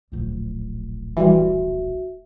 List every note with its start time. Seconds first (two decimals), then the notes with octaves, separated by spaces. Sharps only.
0.12 D1 A#1
1.17 E3 G3 F#4 E5